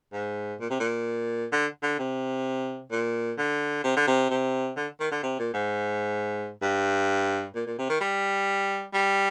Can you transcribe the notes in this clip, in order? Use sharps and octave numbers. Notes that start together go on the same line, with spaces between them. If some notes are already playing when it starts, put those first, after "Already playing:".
G#2
A#2
C3
A#2
D3
D3
C3
A#2
D3
C3
D3
C3
C3
D3
D#3
D3
C3
A#2
G#2
G2
A#2
A#2
C3
D#3
G3
G3